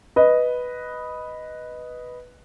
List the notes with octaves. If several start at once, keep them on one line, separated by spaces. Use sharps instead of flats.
B4 D#5